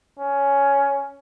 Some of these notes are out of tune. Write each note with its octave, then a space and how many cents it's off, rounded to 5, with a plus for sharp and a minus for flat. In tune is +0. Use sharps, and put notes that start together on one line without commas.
C#4 +10